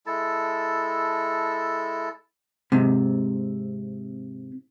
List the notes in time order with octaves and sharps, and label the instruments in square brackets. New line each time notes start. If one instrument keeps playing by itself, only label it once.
[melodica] G#3 E4 A4 A5
[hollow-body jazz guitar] G#2 C3